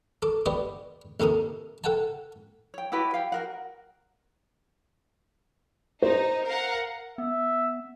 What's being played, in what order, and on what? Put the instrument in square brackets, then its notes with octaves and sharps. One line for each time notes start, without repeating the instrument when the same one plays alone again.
[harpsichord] A4 D6
B3 G4 C5 D5 D#5
D#2 C3 A4 A#4 D#6
A4 F#5 G5 A5
[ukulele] C#5 G5
E4 F#4 G4 B4
F5 G5
F#4 A#4 F#5
[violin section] D#4 [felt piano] C5
[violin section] A#4 F5 F#5
[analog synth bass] B3 [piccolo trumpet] E5